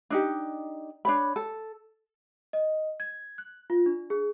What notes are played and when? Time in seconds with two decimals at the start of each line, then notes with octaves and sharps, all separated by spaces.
0.10 D4 D#4 G4
1.05 D4 C#5 B5
1.36 A4
2.53 D#5
3.00 G#6
3.38 F#6
3.70 F4
3.86 D4
4.10 G#4